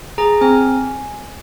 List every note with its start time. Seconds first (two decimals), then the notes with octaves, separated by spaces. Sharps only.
0.18 G#4 A#5
0.41 C4 G#5